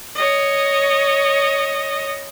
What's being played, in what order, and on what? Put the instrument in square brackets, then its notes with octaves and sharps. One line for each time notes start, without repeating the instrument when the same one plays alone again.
[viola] C#5 D#5